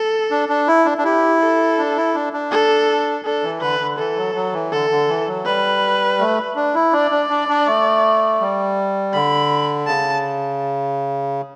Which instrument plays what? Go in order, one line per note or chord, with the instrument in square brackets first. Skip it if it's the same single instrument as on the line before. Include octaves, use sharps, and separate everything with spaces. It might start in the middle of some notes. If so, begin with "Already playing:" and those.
Already playing: [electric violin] A4
[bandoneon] D4
D4
E4
D4
D4
[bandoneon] E4 [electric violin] G4
[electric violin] A4
[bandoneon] D4
E4
D4
D4
[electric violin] A4
[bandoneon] D4 [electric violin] A4
[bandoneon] E3
[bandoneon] D3 [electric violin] B4
[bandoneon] D3
[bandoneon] E3 [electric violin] A4
[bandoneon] F#3
F#3
E3
[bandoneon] D3 [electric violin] A4
[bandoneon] D3
E3
F#3
[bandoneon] G3 [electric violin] B4
[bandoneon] A3
D4
E4
[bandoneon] D4 [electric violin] D5
[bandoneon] D4
D4
D4
A3
G3
[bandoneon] D3 [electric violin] B5
[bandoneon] C#3 [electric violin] A5